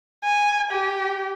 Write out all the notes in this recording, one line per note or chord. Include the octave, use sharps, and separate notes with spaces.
G#5
G4